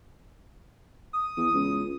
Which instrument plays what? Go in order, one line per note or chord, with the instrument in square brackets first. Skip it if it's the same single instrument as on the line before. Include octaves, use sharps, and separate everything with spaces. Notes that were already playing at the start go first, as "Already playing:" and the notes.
[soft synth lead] D#6
[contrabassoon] E2 [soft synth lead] D#6
[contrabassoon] C#2